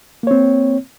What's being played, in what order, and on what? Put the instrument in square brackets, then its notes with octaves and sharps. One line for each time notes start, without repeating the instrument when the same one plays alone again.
[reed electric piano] A#3
C#5
C4